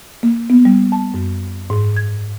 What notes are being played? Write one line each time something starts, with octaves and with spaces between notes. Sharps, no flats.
A#3
B3
G3
A5
F#2
G#2
G#6